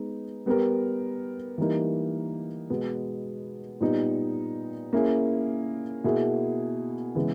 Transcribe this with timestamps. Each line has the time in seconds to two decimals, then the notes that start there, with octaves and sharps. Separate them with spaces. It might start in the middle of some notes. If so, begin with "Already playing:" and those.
Already playing: G#3 B3 D#4
0.46 G3 B3 G4 A#4
1.58 E3 G3 A#3 D#4
2.70 B2 G#3 B3
3.81 A#2 G3 B3 D#4
4.93 A#3 C#4 E4 G#4
6.04 B2 A#3 E4 G#4
7.15 C#3 E3 G#3 B3